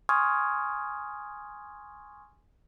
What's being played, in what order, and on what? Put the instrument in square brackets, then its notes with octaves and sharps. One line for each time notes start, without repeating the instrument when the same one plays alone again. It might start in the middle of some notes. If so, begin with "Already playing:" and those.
[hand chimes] G#5 C6 C#6 D#6 F6 G#6